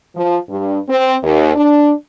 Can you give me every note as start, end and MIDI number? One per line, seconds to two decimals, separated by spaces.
0.16 0.37 53
0.50 0.78 43
0.89 1.17 60
1.23 1.55 39
1.56 1.92 62